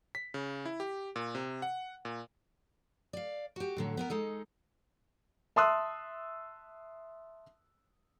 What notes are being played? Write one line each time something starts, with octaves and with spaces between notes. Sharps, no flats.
B6
C#3
E4
G4
A#2
C3
F#5
A#2
D5 F5
F#4 G4
A2 D3 F#3
B3 E4 A#4
G#3 D#4 A4
E5 A5 C6 D#6 E6 F#6